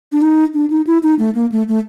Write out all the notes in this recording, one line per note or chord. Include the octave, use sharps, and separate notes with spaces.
D4
D#4
D4
D#4
E4
D#4
A3
A#3
A3
A3